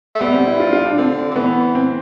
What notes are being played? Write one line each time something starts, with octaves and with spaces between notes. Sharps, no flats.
A3
G3 B3
C4
E4
F4
F4
D4
D3 C4
D3
E3 B3
C4